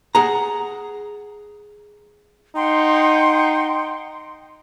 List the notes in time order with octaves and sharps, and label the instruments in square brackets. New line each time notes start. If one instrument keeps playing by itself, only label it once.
[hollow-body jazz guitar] G#4 F#5 A#5
[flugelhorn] D#4 [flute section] F#5 G5 C6